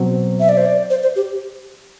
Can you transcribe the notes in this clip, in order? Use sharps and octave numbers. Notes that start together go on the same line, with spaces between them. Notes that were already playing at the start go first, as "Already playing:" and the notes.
Already playing: B2 F#3 C4
E5
D5
C5
D5
C5
C5
G4